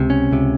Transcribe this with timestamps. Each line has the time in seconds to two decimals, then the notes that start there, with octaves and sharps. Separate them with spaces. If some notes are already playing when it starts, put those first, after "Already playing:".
Already playing: C#2 C3
0.10 C#4
0.31 C#2 C3